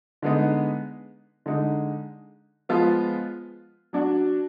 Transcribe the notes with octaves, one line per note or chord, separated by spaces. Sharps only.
D3 G#3 B3 D#4
D3 G#3 D#4
F3 G#3 B3 F4
F#3 D4 F#4